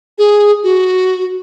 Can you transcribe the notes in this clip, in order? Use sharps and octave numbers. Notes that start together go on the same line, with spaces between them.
G#4
F#4